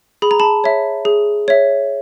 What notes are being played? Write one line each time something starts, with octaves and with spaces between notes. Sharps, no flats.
G#4 B5
A#5
A5 B5
C#5 E5
G#4
C#5 E5